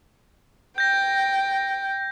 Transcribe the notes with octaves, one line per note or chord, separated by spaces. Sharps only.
G5 G6 A#6